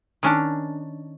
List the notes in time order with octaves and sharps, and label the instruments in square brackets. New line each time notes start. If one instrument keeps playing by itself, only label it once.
[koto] D#3 C#4 D4